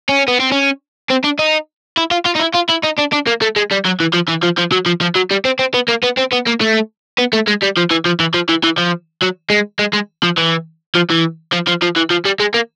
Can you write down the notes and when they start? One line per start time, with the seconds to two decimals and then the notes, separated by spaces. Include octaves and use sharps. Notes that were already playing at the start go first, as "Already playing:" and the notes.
0.09 C#4
0.28 B3
0.40 C4
0.52 C#4
1.10 C4
1.24 D4
1.39 D#4
1.97 E4
2.11 F4
2.26 F4
2.36 D#4
2.40 E4
2.55 F4
2.70 E4
2.84 D#4
2.99 D4
3.13 D4
3.27 A#3
3.42 A3
3.56 G#3
3.71 G3
3.85 F#3
4.00 E3
4.14 F3
4.29 E3
4.43 F3
4.58 F3
4.72 F#3
4.86 F3
5.01 F3
5.15 F#3
5.31 G3
5.45 C4
5.59 C4
5.74 B3
5.88 A#3
6.03 B3
6.17 C4
6.32 B3
6.47 A#3
6.61 A3
7.19 B3
7.33 A3
7.47 G#3
7.62 G3
7.77 F3
7.90 E3
8.05 F3
8.20 E3
8.34 F3
8.49 E3
8.64 E3
8.78 F3
9.22 F#3
9.50 G#3
9.79 G#3
9.93 G#3
10.23 F3
10.37 E3
10.95 F3
11.10 E3
11.53 F3
11.68 F3
11.82 F3
11.96 E3
12.11 F3
12.25 G3
12.40 G#3
12.54 A#3